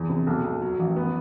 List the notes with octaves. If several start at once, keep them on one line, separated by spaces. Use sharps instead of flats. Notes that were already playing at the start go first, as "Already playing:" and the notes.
Already playing: E2
C3
B1
B1
F#3
A1
B3